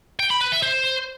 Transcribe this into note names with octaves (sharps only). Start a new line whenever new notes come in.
G5
B5
B4
E5
C5